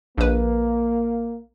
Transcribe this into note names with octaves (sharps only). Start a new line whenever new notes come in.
A#1 A#3 B4